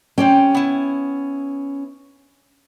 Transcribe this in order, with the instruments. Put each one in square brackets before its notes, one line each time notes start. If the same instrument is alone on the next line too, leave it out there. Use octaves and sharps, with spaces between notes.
[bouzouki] C4 G4 G5 [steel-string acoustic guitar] C#4
[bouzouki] B3 E4